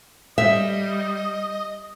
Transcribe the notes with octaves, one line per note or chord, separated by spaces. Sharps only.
G3 D#5 E5